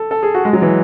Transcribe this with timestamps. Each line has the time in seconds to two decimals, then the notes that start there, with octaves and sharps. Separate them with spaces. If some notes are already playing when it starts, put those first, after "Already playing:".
Already playing: A4
0.11 A4
0.23 G#4
0.35 F#4
0.45 G#3
0.53 F#3
0.62 E3